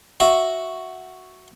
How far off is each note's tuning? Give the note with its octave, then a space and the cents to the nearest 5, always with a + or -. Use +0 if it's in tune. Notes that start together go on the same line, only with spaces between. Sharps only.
F#4 +0 E5 +0